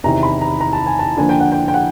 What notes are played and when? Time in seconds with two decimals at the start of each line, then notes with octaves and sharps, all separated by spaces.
0.04 E2 C3 D#3 A#5
0.23 B5
0.41 A#5
0.61 A#5
0.73 A5
0.86 G#5
0.99 A5
1.17 D3 F3 A#3 D4 G#5
1.29 G5
1.40 F#5
1.52 G5
1.68 G5
1.74 F#5